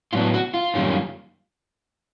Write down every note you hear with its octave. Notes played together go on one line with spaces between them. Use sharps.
A2 F#3 B3 D4 F4
F#4
F4
F#2 D#3 G3 A#3 C#4